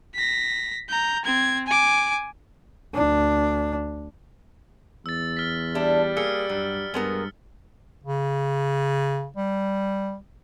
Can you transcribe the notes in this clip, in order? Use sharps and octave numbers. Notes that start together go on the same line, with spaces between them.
A#6 B6
A#5 G6
C4 G#6
G#5 D6
D2 D4
E2 E6 A6
F6 B6
G3 D4 E4
A#3 G#4 E6 F6 C#7
G2 F#3
G2 G#3 B3 A#4
C#3
G3